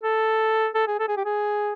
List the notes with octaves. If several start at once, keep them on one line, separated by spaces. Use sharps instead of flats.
A4
A4
G#4
A4
G#4
G4
G#4